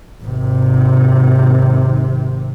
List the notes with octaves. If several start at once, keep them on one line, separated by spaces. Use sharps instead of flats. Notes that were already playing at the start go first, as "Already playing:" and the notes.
G#1 C3